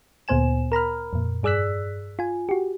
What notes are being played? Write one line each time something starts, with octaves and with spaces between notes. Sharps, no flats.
D2 A#2 B3 C5 G#5 E7
A#4 A#5 B5 F6
F2 A#2
G2 G#4 D5 E6 F#6 B6
F4 G#5
F#4 G4